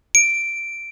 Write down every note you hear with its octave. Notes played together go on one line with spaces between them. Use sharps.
D7